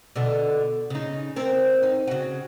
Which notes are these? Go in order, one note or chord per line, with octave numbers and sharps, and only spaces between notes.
B2 D3 A4
C#3 D#4
C4 A#4
D#4
C#3 F#4